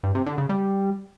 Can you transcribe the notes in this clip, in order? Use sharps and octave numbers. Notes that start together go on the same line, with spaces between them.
G2
C3
D3
C#3
G3